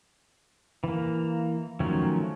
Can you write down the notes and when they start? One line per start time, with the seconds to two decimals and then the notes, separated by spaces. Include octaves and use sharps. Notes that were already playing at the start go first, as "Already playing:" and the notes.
0.84 E3 A#3
1.80 D#3 F3 F#3 A3 C#4